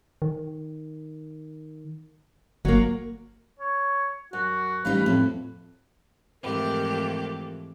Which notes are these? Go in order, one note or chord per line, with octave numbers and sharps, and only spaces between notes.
D#3
G1 F#3 A#3
C#5
F#2 F#4
A1 G3 D#4 B4 F5
F2 A2
F2 G#2 E3 A3 G4 A#4